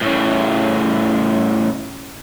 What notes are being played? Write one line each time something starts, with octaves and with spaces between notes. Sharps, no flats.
A2 C#3